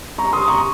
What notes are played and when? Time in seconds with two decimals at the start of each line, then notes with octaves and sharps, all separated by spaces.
0.18 A#5 C#6
0.33 C6 D#6
0.48 A#5 C#6